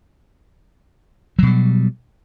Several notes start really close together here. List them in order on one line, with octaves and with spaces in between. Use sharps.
F#3 B2 G3